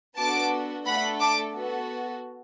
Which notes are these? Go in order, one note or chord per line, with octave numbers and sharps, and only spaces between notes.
B3 D4 F#4 A4 A5 D6
A3 D4 A4 F#5 B5
A5 D6
B3 F#4 A4